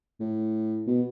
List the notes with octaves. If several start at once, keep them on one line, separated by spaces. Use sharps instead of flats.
A2
B2